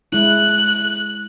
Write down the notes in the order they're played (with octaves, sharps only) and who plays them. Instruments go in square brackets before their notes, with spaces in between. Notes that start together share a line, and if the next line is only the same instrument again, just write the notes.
[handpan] G#3 E4 [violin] F#6